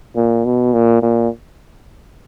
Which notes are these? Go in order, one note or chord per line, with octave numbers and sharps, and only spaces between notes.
A#2
B2
A#2
A#2